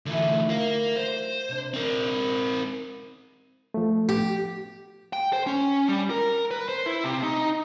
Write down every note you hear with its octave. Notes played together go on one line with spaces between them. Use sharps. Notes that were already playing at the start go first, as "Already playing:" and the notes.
D3 E3 F#3 A3 E4
A#4 F5
C5
C3 D4
C4 A#4
F3 A3
G4
G5
C5
C#4
G3
A#4
B4
C5
E4
C3
D#4